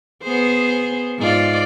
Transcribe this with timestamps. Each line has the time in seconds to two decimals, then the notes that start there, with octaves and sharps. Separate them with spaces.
0.23 B3 G#4 C5
1.18 G#2 F4 D5